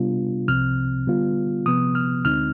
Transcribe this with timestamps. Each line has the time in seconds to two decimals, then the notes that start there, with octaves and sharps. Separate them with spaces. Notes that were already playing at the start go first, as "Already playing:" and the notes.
Already playing: C3 G3 B3 D4 F4
0.47 C2 C3 F3 C4 F6
1.07 D3 G3 B3 F4
1.66 C3 F3 B3 D#6
1.95 F6
2.24 D2 D3 G#3 C4 D#4 F6